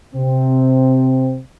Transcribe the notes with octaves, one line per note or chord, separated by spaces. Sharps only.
C3 C4